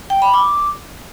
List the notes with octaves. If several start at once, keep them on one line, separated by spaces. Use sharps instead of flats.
G5
B5
D6